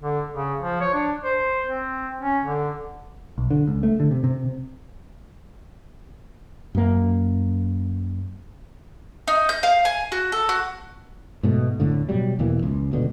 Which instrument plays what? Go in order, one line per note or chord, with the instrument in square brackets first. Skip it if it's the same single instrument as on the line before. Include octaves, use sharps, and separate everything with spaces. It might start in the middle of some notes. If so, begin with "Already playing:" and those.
[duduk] D3
C#3
F3
C#5
D4
C5
C4
C#4
D3
[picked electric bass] B1
D3
C#2
A3
D3
C3
C3
[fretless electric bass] F#2 A#3
[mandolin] D#4
G6
F5
G#5
F#4
A4
F#4
[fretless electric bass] G#2 B2 A3
D1 A2 D3
B2 F#3 G3
E2 B2 E3 A#3
C#2
D#1 B2 D3